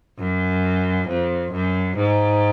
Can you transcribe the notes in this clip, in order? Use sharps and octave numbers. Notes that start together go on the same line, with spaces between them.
F#2
F2
F#2
G#2